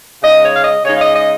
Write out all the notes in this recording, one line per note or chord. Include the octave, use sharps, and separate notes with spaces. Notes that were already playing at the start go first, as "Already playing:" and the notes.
C#3 G#3 D#4 D#5
C#5
F5
D#5
C#3 G#3 D#4 C#5
F5
D#5
D#5